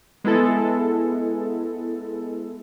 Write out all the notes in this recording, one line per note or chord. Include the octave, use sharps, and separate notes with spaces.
G#3 B3 E4 A4